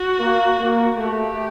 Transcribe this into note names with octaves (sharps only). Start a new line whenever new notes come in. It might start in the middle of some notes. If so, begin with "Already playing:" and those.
Already playing: F#4
A#3
A#3
A3 G4